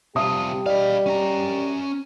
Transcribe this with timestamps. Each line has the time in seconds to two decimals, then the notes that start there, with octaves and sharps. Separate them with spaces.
0.16 C3 G3 F4 G4 E5 A5 D#6
0.66 D5 D#5 F5 B5
1.06 C#4 A#5